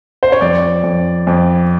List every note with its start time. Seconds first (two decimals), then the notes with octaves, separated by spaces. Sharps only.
0.23 C5
0.32 C#5
0.41 F2 D5
0.83 F2
1.27 F2